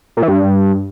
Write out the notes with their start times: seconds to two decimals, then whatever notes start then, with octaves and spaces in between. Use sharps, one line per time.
0.17 A#2
0.23 E3
0.28 G2